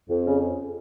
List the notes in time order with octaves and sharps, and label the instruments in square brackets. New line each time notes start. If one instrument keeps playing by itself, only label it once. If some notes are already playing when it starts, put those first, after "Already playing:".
[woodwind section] F2
C#3